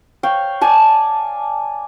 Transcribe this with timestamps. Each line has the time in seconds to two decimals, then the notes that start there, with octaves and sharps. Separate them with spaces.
0.23 C#5 F5 G5
0.61 D5 G#5 A5